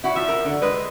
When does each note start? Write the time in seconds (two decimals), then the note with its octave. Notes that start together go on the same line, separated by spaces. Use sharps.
0.04 E4 F#4
0.16 F3 E5
0.29 A#4
0.45 D3
0.62 G#3 B4